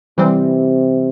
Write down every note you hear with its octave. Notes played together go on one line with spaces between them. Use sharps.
C3 E3 G3 C4